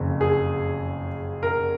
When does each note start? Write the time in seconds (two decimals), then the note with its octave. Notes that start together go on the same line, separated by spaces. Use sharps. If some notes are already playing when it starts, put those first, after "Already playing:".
Already playing: F#1 F2 C#3
0.21 G#4
1.43 A#4